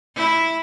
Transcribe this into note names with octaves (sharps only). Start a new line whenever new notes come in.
E4